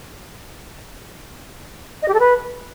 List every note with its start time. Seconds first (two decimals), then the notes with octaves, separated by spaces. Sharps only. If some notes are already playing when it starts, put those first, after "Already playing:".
2.02 D#5
2.08 G4
2.14 A4
2.20 B4